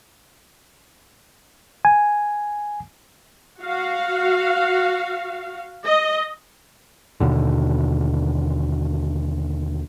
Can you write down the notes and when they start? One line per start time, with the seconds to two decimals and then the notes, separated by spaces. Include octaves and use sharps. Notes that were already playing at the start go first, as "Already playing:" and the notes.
1.85 G#5
3.62 F#4 F5
5.86 D#5
7.20 D#2 B2 D3